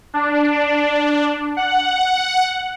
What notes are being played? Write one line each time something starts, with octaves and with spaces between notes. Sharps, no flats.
D4
F#5